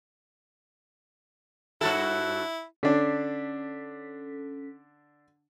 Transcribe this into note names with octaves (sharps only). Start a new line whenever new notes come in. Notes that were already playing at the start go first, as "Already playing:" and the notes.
G2 E4 F#4 A4
D3 C#4 D4 A4 B6